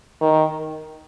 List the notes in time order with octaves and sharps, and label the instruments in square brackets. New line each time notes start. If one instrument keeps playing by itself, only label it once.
[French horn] D#3